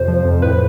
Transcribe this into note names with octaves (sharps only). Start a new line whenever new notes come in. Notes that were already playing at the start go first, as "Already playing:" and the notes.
Already playing: F2 C3 C5
F3
F2
A2 B4